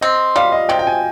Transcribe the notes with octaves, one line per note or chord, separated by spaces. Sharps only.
C4 D#5
G3 F5
D#5
C3 G5
G5
G#5